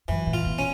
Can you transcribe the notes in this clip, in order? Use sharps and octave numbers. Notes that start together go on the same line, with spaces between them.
F#2 E3
A2
F4
B2
C#4